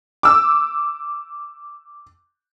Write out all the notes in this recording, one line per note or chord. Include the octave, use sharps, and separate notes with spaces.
D6 E6